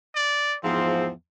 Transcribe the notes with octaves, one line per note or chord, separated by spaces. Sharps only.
D5
E2 G#2 F3 C4